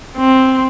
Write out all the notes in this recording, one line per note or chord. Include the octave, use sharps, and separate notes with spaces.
C4